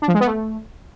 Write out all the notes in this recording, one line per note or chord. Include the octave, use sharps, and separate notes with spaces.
D4
F3
G#3
B3
A3